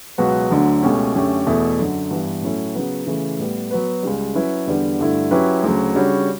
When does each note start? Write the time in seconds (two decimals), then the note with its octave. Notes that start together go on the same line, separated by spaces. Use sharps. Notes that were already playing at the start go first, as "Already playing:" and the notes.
0.18 C#2 B2 F#3 B3 F#4
0.51 D2 D3 F#3
0.83 C#2 B2 A3 C#4 G4
1.15 F#2 D3 A3 C#4 G4
1.47 E2 B2 A3 E4 A4
1.79 F#2 D3 F#3
2.10 G2 E3 B3
2.42 A2 F#3 C#4 E4 A4
2.75 C#3 F#3 B3
3.07 C#3 E3 A3
3.39 A2 G3 B3
3.71 F#3 B3 F#4 B4
4.03 C#2 C#3 G3
4.35 F#3 C#4 E4 B4
4.67 E2 D3 G3 B3 D4
4.99 G2 D3 A3 E4
5.31 F#3 C#4 E4 G4 B4
5.63 D2 C#3 F#3
5.95 C#3 G3 D4 F#4 C#5